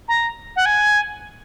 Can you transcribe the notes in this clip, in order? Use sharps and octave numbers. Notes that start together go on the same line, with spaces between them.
A#5
F#5
G#5